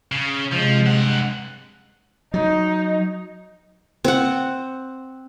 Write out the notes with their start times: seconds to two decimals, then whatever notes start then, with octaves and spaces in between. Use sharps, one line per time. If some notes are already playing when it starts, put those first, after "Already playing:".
0.12 C#3
0.53 C3 F3 G#3
0.87 G2 F#5
2.34 F#3 D#4
4.05 C4 F#5